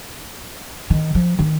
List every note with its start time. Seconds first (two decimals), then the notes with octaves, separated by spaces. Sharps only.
0.90 D#3
1.15 F3
1.39 D#3